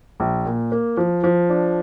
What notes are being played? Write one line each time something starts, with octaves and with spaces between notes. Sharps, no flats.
A#1
A#2
A#3
F3
F3
D4